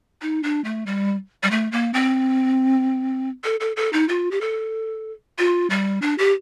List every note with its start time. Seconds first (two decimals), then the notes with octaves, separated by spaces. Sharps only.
0.22 D#4
0.43 D4
0.64 A3
0.86 G3
1.43 G3
1.51 A3
1.72 A#3
1.94 C4
3.44 A4
3.60 A4
3.76 A4
3.93 D#4
4.09 F4
4.31 G4
4.41 A4
5.38 F4
5.70 G3
6.02 D4
6.18 G4